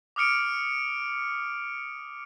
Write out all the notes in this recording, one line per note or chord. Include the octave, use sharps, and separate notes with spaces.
D6 D#6 F6 C#7 D7